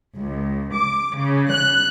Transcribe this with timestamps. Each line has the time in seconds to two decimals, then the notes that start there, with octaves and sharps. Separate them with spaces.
0.17 C#2
0.74 D6
1.16 C#3
1.51 F#6